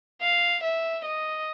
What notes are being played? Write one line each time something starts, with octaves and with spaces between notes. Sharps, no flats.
F5
E5
D#5